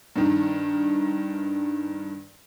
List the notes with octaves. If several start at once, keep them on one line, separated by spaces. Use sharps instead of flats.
G2 D#3